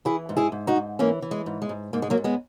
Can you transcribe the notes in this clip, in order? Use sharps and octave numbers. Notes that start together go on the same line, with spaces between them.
E3 E4 G#4
G#2
E4 G#4
G#2
D#4 F#4
G#2
E3 A#3 C#4
E3
G#3
G#2
G#3
G#2
G#2 A#3
G#3
F#3 A#3
G#2
G#3 B3